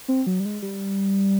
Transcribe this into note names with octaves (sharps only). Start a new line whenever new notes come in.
C4
F#3
G3
G#3
G3